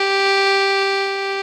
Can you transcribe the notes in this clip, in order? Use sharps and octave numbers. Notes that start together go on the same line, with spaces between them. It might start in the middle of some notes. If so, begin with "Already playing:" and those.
Already playing: G4